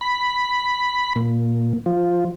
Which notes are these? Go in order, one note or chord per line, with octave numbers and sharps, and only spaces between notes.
B5
A#2
F3